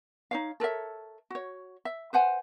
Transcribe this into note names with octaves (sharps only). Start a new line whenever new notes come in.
D#4 C#5 F5
A4 A#4 C#5 E5
F#4 C#5
E5
B4 C5 F#5 G#5